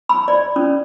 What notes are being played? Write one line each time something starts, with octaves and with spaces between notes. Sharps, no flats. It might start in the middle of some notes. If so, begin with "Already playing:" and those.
B5
D5
C#4